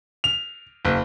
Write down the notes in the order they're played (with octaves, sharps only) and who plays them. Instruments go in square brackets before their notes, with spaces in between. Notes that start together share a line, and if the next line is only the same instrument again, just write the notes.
[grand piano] F7
F#1